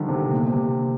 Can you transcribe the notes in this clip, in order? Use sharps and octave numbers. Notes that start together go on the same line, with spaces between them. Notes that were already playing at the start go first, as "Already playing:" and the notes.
Already playing: D3 D#3 F3 G3
C3
A#2
C3